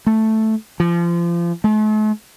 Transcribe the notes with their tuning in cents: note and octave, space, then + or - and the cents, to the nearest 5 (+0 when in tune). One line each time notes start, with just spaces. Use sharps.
A3 +0
F3 -30
A3 -45